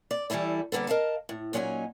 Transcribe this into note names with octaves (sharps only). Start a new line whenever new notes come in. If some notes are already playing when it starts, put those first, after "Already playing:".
D5
E3 G3 A3 E4 A4
D3 G3 A#3 B3 A4
A#4 D#5 F5 A5
A2
A#2 F#3 C#4 D#4 G#5